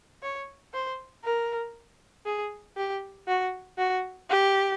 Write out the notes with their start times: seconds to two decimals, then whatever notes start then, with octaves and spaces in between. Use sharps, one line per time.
0.22 C#5
0.74 C5
1.24 A#4
2.26 G#4
2.77 G4
3.28 F#4
3.78 F#4
4.30 G4